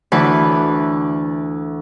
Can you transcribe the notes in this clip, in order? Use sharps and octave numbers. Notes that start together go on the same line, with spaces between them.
D2 E3 B4